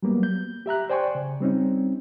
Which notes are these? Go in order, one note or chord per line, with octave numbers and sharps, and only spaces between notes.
F#3 G3 A#3 B3
G6
G4 E5 A#5 F#6
C5 D5 G5 G#5 C6 C#6
C#3
G3 C4 C#4 D#4